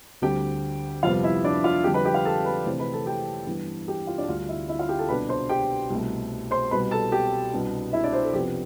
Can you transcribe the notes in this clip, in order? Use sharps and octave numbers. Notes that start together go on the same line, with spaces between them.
D2 D3 G3 C4 G4 G5
F2 C3 G3 B3 F4 F5
E4 E5
D4 D5
F4 F5
F2 D3 G3 D4 G4 G5
B4 B5
G4 G5
F4 F5
A4 A5
B4 B5
C3 E3 A3 C4
B4 B5
A4 A5
G4 G5
G2 E3 B3 D4
G4 G5
F4 F5
D4 D5
D2 D3 G3 F4 F5
E4 E5
E4 E5
F4 F5
G4 G5
A4 A5
C2 B2 B3 D4 B4 B5
C5 C6
G4 G5
C2 B2 A3
C5 C6
C2 B2 G3 B4 B5
A4 A5
G4 G5
C2 B2 B3 D4
E4 E5
D4 D5
C4 C5
A4
F2 C3 F3 B3 G4